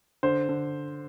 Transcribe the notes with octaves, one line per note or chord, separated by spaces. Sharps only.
D3 C5
D3